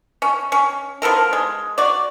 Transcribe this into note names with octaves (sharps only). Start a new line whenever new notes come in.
C#4
C#4
F3 B3 A4 A#4
G#3
F#4 D5